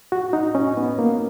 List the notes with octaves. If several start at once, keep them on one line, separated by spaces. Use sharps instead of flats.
F#4
D#4
C#4
B3
A#3